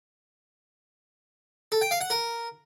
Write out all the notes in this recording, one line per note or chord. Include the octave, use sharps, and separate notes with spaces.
A4
G5
F5
F#5
A#4